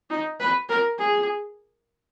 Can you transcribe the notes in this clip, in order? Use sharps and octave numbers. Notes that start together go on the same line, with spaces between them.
D#4
B4
A#4
G#4